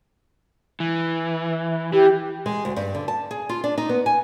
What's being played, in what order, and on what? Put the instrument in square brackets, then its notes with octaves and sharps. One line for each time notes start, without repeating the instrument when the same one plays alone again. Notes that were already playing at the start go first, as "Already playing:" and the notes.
[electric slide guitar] E3
[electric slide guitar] E3 [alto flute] G4
[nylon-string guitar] G#3
D2
G2
D3
A5
G#4
F4
D4
D#4
B3
G#5